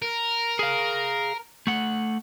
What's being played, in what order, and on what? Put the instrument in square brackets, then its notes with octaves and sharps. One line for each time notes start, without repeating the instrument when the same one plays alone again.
[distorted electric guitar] A#4
[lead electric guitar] G#4 F5
A3 F#5